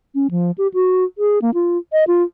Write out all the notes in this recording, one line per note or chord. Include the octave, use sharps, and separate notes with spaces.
C#4
F3
G4
F#4
G#4
A#3
F4
D#5
F4